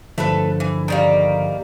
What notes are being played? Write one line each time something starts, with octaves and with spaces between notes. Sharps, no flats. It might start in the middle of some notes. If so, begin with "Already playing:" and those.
G2 D3 F3 A3 A4 B4
E3
D#3 G3 A#3